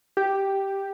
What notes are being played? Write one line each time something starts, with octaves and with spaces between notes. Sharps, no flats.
G4